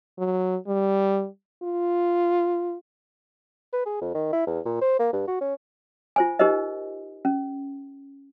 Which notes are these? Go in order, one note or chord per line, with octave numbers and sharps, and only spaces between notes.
F#3
G3
F4
B4
G#4
F2
D#3
E4
E2
A#2
C5
A#3
G2
F#4
C#4
F4 C5 G#5
D#4 G4 A#4 C5 D#5
C#4